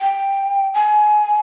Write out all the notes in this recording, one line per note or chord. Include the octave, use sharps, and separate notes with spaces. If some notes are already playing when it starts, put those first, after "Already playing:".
G5
G#5